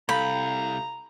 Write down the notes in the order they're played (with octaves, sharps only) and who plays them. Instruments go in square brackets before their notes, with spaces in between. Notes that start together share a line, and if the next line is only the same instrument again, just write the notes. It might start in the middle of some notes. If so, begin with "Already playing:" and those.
[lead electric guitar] C2 [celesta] A4 F5 G6 [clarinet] A#5 [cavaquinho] B5